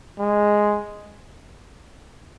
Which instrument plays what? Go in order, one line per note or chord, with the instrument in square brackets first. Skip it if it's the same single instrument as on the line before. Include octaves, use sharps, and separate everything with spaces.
[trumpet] G#3